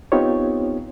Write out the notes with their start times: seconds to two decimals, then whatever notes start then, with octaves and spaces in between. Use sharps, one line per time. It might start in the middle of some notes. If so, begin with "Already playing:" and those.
0.12 B3 C4 D#4 F4 G4 C#5